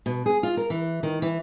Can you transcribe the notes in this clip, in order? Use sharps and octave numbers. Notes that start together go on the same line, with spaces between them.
B2
G#4
F4
A#4
E3
D#3
E3